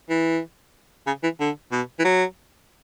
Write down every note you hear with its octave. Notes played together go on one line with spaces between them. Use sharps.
E3
C#3
E3
D3
B2
E3
F#3